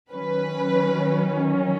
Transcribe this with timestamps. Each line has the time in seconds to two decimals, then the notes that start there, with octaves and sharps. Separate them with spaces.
0.12 D#3 F#3 C#4 B4